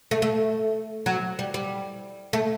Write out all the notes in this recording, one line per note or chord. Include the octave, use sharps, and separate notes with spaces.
A3
A3
F#3
G3
G3
A3